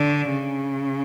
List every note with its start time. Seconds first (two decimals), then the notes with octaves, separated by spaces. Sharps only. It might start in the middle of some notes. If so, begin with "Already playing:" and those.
Already playing: D3
0.31 C#3